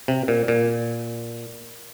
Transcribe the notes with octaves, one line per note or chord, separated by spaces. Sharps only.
C3
A#2
A#2